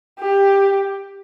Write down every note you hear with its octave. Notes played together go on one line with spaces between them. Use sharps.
G4